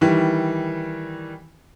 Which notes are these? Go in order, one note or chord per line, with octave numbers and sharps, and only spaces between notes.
D#3 E3 G3